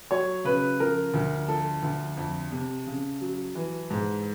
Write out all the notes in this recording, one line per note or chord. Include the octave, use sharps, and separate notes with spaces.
F#3 C#5
C#3 B4
F3 A#4
D2
F3 A4
D2
F2
C3
C#3
F#3
E3
G#2